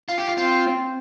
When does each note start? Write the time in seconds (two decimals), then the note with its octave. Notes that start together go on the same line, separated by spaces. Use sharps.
0.09 F4
0.18 G4
0.27 F4
0.38 C4 F4